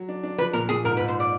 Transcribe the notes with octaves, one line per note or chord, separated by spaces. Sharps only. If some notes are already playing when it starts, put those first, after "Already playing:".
Already playing: F#3
D4
D4
F3 B4
A#2 A#4
A#2 G#4
G#2 A#4
B4
G#2
C5
D5